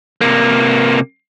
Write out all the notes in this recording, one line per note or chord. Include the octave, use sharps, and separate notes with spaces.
C3 A#3